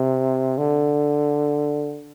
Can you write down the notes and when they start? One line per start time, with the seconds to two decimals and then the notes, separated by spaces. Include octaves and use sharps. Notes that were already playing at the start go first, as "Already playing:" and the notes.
Already playing: C3
0.58 D3